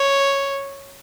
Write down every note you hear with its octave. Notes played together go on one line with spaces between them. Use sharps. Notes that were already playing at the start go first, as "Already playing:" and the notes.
Already playing: C#5